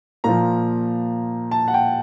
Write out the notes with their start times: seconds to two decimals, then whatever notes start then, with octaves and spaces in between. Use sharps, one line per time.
0.24 A#2 F3 A#5
1.51 A5
1.68 F#5
1.74 G5